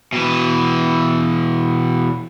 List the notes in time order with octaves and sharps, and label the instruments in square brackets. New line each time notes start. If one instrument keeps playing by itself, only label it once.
[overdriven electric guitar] B2 E3